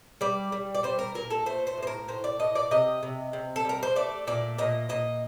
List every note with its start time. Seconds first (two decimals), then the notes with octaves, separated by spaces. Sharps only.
0.21 G3 D5
0.52 G3
0.75 D5
0.83 G3 C5
0.99 A#4
1.15 A#2 A#4
1.30 A4
1.46 A3 C5
1.67 C5
1.77 A2
1.82 C5
1.87 A#4
2.08 A2 C5
2.24 D5
2.39 A2 D#5
2.55 D5
2.71 C3 D#5
3.03 C3
3.33 C3
3.56 A4
3.65 G3 A#4
3.83 C5
3.96 A3 D5
4.27 A#2 D5
4.58 A#2 D#5
4.89 A#2 D#5